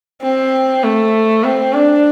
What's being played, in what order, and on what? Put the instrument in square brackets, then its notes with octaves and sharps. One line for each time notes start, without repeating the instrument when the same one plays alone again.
[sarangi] C4
A3
C4
D4